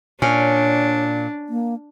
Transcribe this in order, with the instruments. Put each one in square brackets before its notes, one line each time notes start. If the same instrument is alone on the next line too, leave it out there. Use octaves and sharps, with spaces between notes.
[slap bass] A#2 [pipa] C#4 [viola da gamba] D4 [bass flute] C#5
[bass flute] A#3